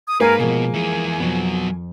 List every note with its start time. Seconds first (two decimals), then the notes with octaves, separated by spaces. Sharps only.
0.07 D#6
0.20 G#2 A#3 A#4 B4 G#5 C7 D#7
0.39 B2 F3 G#3 A#4 G#5
0.74 E3 G#4
1.20 F2 F#3 B3